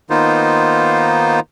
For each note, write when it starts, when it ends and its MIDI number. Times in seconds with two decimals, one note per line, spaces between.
0.10 1.40 51
0.10 1.40 58
0.10 1.40 59
0.10 1.40 63
0.10 1.40 65
0.10 1.40 72